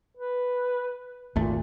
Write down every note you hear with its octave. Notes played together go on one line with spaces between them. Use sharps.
B4
G#1 D#2 A#2 A3